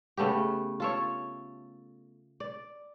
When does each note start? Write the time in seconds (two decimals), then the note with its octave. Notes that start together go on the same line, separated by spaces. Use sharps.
0.17 C#3 A3 B3 G4
0.80 F4 A4 C#5
2.40 D5